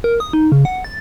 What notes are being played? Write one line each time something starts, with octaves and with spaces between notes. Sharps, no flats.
A#4
D#6
D#4
C#3
F#5
A6